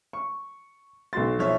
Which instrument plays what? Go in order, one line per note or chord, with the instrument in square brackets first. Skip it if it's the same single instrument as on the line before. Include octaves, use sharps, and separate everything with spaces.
[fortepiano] C#6
[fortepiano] B1 F#4 C6 [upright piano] A6
[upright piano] F3 C#5 E5